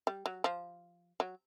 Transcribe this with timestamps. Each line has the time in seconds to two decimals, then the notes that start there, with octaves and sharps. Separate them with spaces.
0.07 G3
0.26 F#3
0.44 F3
1.20 F#3